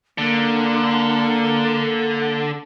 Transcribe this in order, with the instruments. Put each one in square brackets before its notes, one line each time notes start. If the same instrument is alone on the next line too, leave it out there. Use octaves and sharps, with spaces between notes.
[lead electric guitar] D3 [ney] A#3